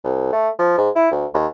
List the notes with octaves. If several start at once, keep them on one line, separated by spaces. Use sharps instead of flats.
C2
A3
F3
G#2
E4
D2
D#2